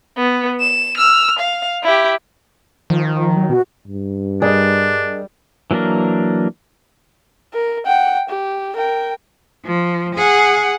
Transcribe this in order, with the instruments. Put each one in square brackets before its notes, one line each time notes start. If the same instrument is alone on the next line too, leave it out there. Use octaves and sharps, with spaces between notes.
[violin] B3
E7
E6 F6
F5
E4 G4
[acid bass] D#3 [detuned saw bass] F3
[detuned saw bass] F#3
[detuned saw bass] B2 [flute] F#4
[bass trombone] G2
[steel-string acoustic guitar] G3 [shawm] D4 [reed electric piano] G#4 A#4 D#5
[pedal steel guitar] E3 F#3 A#3 D4 A#4
[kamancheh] A#4
F#5 G5
G4
A#4 G5
[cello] F3
G#4 F#5